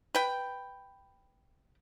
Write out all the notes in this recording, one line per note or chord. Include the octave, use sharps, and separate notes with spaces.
B4 G5